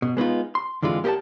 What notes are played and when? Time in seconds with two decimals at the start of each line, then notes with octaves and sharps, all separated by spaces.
0.02 B2
0.17 G#3 B3 D#4 F4
0.55 C6
0.82 F2 D3 E3 G#3 F4
1.04 A#3 G4 A#4 D#5 F#5 A5